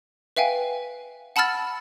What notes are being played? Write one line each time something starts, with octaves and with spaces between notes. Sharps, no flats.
B4 E5 F5 G5 G#5
F#5 A5 B5 E6 F6 A6